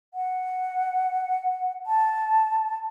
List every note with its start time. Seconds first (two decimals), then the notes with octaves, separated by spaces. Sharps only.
0.14 F#5
1.86 A5